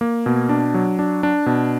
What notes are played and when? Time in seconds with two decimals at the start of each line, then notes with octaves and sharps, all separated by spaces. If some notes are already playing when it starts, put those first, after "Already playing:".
0.01 A#3
0.26 B2
0.49 D4
0.74 F#3
0.99 D4
1.23 D4
1.46 B2